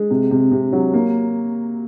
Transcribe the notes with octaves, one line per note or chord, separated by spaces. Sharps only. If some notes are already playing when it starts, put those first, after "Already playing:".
Already playing: G#3
C3
C3
C3
F#3
A#3